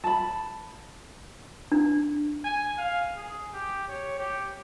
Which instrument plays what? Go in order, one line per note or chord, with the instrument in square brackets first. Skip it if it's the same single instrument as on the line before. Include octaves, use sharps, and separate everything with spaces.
[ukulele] A5 B5
[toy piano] D4
[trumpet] G#5
F5
G#4
G4
C#5
G4